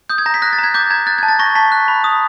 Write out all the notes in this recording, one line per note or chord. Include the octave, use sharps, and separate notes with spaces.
D#6 G6
G#6
A#5 A#6
B6
F#6 A#6
A6
A#5
G#6
D6 G6
A#5 G#6
F#6 A6
A5 G#6
A6
C#6 A#6
A5 B6
F#6
B5
D#6